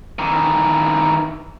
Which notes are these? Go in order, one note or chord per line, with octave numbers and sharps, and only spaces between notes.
D#3 E3